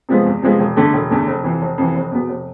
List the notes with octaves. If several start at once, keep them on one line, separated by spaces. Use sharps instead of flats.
C3 F3 G#3 B3
E2
C3 F3 G#3 B3
E1
E2 D3 A3
E1
E2 D3 A3
F1
F2 C3 E3
F1
F2 C3 E3
F1
E2 B2 B3
F1